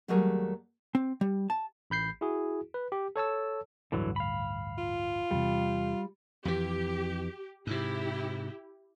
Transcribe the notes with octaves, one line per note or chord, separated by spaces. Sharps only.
D#2 F#3 G3 A3 G#4 A#4
C4
G3
A5
A1 B5 G6 C7
E4 F#4 G#4
B4
G4
A4 C#5 A5 E6
A1 D2 G2 D3 E3 F#3
F5 B5
F4
E2 C3 G3
F2 E3 G4
G#2 C3 E4 G4